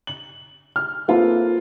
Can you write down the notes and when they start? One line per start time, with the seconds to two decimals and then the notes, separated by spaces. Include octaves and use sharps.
0.07 F#7
0.76 F6
1.08 A#3 C4 F4 A4 B4